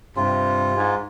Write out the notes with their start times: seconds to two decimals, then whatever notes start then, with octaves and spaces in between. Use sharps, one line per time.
0.16 G2 C3 F4
0.76 G#2